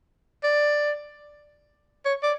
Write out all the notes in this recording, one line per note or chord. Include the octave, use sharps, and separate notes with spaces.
D5
C#5
D5